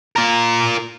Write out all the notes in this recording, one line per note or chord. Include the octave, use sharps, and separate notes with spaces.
F4 A#4